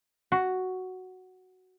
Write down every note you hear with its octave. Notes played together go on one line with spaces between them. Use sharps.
F#4